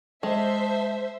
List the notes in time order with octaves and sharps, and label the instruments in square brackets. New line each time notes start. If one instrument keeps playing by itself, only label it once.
[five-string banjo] G#3 [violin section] C5 E5 [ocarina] A5